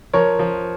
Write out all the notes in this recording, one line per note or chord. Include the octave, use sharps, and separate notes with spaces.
F3 A#4 C#5
F3